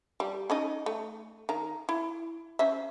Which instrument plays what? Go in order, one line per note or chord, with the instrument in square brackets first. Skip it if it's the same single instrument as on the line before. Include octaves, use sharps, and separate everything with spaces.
[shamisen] G3
C#4 D#4 D#5
A3
D#3 A#5
E4
C#4 C5 E5